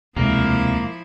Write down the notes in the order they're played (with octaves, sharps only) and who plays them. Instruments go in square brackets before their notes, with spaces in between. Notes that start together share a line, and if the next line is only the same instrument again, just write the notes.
[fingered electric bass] E1 G#3 [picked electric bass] D2 C3 [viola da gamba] F3 E4 [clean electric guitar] A#3